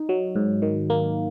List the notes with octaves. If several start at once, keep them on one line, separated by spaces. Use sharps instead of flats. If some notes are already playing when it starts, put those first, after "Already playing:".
Already playing: D#4
F#3
G#2
D#3
A#3